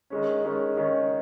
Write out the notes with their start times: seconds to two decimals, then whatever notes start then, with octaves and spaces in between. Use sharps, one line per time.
0.10 D#3 G#3 C#4
0.44 D#3 G#3 C#4
0.77 D#3 G#3 C#4